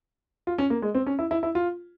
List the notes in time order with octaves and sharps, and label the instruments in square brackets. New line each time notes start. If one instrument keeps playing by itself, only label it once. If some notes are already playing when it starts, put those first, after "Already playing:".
[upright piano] F4
C#4
A#3
G#3
C4
C#4
E4
E4
E4
F4